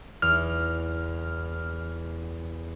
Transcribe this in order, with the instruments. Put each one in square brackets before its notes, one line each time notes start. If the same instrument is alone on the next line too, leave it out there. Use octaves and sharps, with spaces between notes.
[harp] E2 [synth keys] F6